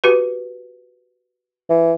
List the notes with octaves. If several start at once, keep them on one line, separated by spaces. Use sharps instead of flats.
F#4 G4 B4
E3